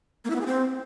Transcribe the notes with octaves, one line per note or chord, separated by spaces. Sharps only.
A#3
E4
B3
G#4
C4